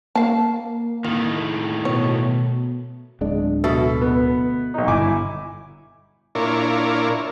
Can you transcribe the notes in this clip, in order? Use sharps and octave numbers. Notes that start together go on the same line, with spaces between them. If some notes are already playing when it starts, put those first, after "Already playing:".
A#3 F5 A5
A2 D#3 F4
B2 C#5
D1 G#3 D4
B2 A4 E5
B3
B1 D#4
G1 E4 G#5 D6
A#2 D4 E4 F4 A#4 C#5